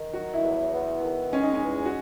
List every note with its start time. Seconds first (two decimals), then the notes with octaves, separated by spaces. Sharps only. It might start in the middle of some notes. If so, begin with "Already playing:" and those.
Already playing: D#3
0.13 F#3 F#4
0.34 E4
0.43 E2
0.73 B3
1.02 D#3
1.32 G#3 C#4
1.43 D#4
1.54 C#4
1.62 E2
1.85 F#4